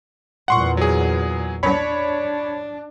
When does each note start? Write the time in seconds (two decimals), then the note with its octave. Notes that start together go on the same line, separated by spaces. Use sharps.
0.48 E2 A#2 F#5 C6 C#6
0.77 F#3 G#4
1.63 D4 C#5 B5